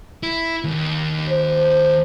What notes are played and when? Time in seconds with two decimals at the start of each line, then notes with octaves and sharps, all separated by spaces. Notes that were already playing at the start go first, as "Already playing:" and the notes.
0.23 E4
0.64 D#2
1.29 C5